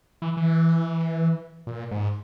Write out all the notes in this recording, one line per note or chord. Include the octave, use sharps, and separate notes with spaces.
E3
E3
A#2
G#2